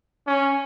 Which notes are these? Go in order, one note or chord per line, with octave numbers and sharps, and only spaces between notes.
C#4